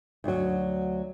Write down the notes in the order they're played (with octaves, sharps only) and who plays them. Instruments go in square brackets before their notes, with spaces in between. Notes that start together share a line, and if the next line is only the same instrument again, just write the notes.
[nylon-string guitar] D2 F#3